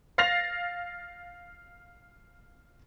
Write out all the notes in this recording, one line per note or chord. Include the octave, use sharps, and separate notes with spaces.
F5 F6 A6 A#6 C7 F7